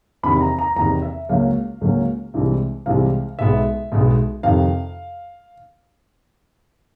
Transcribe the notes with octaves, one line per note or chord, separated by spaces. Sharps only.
E2 C3 D#3 B5
A#5
A#5
E2 C3 D#3 A#5
E5
C#2 C#3 F#3 A#3 C#4 F5
C#2 C#3 F#3 A#3 C#4
C2 C3 E3 G#3
C2 C3 E3 G#3 F5
B1 B2 G#3 B3 E5
B1 B2 G#3 B3
F2 C3 D#3 F5